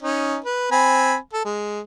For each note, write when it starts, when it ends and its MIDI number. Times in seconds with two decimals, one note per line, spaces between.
0.03 0.38 61
0.03 0.38 63
0.45 0.70 71
0.72 1.16 60
0.72 1.16 80
0.72 1.16 83
1.33 1.44 69
1.45 1.80 56